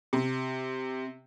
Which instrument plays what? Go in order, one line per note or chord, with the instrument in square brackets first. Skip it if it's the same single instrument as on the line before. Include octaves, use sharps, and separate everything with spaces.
[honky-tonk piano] C3